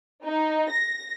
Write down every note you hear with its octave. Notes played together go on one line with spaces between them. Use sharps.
D#4
A#6